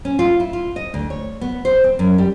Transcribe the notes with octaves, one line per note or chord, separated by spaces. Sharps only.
C#4
F4
E4
F4
D#5
D2
C#5
B3
C5
C4
F#2
G3